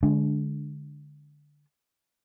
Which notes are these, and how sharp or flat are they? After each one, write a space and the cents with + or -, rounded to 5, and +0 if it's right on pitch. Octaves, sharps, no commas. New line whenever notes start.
D3 +0 G#3 +10 D4 -20